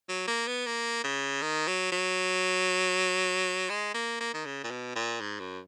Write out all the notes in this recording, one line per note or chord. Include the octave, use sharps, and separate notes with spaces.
F#3
A#3
B3
A#3
C#3
D#3
F#3
F#3
G#3
A#3
A#3
D#3
C#3
A#2
B2
A#2
G#2
F#2